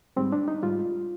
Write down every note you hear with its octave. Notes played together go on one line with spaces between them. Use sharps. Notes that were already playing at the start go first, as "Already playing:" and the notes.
G#2 G3 C4
D4
D#4
G#2 G3 F4